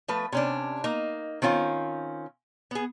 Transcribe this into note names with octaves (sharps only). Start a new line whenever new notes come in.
F3 A3 B4
C3 C#4 D4
A#3 D#4
D#3 C4 C#4 F4
B3 G#4